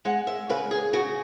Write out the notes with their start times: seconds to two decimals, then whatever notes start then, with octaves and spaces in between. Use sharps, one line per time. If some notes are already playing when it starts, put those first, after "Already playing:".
0.05 G#3 F#5
0.27 E5
0.49 C#3 B4
0.71 G#4
0.93 C#3 F#4